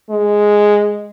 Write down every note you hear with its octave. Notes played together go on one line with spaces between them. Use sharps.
G#3